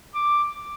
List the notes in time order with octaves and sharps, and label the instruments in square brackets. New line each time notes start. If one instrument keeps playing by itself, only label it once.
[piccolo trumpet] D6